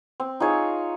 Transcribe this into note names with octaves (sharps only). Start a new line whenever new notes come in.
C4
D#4 F4 G#4 C#5